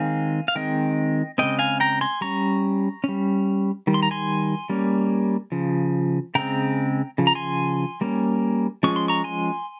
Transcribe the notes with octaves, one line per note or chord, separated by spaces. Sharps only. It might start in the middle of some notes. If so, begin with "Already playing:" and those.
Already playing: D#3 G#3 C4 F5 G#5
F5
D#3 G#3 C4 D#5 G5
C#3 G#3 C4 D#5 G5
F5 G#5
G5 A#5
G#5 C6
G3 C#4 A#5 C#6
G3 C#4
D#3 G3
C6
A#5
G#5 C6
G3 A#3 C#4
C#3 F3
C#3 G#3 C4 G5 A#5
C#3 F3
A#5
G#5 C6
G3 A#3 C#4
F3 G#3 C#4 C#6
C6
A#5 C#6
G#5 C6